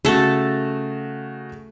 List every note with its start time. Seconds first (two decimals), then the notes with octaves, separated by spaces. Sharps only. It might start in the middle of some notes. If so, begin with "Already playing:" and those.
0.05 C#3 A3 F#4 A4